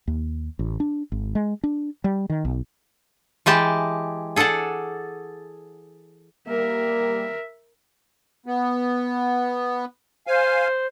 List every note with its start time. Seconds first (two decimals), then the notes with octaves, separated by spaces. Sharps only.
0.07 D#2
0.59 A1
0.80 D4
1.12 G#1
1.35 G#3
1.64 D4
2.04 G3
2.30 D#3
2.45 B1
3.46 E3 G#3 G4 A5
4.36 G#4 A4 D5 F#5 A5
6.47 G3 A#3 A#4 E5
8.46 B3
10.27 C5 F5 G#5